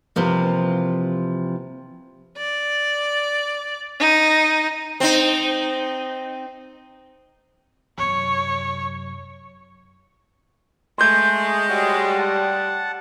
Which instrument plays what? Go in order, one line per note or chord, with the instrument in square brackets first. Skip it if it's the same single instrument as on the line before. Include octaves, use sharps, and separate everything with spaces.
[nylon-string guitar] C3 E3 F3 A#3
[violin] D5
D#4
[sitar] C4 D#4
[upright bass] F#2 C3 [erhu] C#5
[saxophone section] G#3 [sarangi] A3 [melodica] G#5 [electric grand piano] C6 G6
[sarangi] G3 [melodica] F#4 G#4 C#5
[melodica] F#5 A5